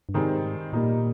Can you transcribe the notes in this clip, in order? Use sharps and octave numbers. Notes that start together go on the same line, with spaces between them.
G2
G#2 D#3 G3 C4 D#4 G#4
A#2 G3 A#3 D#4